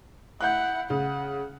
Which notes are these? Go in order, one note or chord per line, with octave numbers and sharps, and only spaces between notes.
E4 F#5 F#6 G6
C#3 F#5